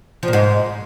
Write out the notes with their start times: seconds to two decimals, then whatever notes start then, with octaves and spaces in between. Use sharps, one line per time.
0.23 F3
0.28 A#2
0.33 G#2